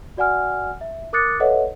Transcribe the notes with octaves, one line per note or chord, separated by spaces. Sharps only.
F#4 D5 F#5 G#5 F6
E5
A#4 D6 D#6 F#6 A6 C#7
A4 B4 C#5 D#5 E5 F#5